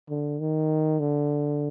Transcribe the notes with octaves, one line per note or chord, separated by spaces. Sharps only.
D3
D#3
D3